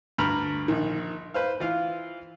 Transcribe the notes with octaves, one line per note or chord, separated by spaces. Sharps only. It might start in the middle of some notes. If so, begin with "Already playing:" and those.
D2 G2 A#5 B5 F6
A#1 D#3
B4 C5 F5
E3 F4 F5